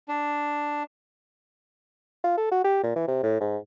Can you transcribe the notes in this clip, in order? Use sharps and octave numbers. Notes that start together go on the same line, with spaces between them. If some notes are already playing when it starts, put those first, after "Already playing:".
D4
F4
A4
F#4
G4
A#2
E3
C3
A2
G#2